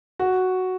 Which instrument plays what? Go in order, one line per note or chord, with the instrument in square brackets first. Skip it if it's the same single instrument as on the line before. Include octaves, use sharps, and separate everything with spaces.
[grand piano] F#4